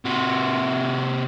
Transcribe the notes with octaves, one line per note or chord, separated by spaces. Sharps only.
C3 F#4